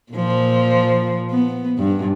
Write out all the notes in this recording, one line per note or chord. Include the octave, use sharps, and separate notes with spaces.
A#2 F3
B3
G2